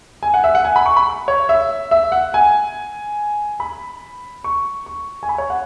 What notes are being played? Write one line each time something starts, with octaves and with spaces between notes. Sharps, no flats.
G#5
F#5
E5
F#5
G#5
B5
C#6
B5
C#5
E5
E5
F#5
G#5
B5
C#6
C#6
G#5
B5
C#5
F#5